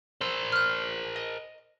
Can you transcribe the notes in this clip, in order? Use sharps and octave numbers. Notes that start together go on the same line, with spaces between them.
A#4 C5 E6
F6 F#6
D#5